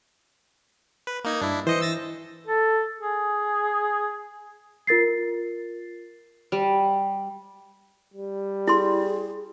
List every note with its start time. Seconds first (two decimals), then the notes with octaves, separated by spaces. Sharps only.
1.07 B4
1.24 A#3 D#4 G#6
1.41 G2 D4 E4
1.67 E3 C5 D#5 C#7
1.81 E6 A6 A#6
2.46 A4
2.99 G#4
4.87 F4 A#4 A6 C7
6.52 G3
8.14 G3
8.68 E4 G#4 C6